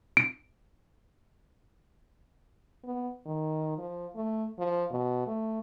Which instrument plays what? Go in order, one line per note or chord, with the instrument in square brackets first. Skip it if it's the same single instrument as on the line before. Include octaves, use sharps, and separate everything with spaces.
[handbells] D7
[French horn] B3
D#3
F3
A3
F3
B2
A3